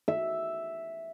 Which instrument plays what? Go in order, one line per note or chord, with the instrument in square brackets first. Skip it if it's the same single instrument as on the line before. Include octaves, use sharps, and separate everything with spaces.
[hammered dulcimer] E5